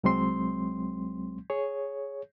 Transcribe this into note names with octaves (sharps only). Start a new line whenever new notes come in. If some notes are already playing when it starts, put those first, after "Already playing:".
C2 F#3 G#3 C4 C6
G#4 C#5